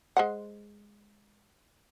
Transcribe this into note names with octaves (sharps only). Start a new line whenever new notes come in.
G#3 C5 F#5